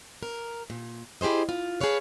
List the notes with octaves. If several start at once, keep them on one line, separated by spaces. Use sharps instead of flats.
A#4
A#2
E4 G4 G#4 C5 D#5
F4
G#4 A4 B4 C#5 F5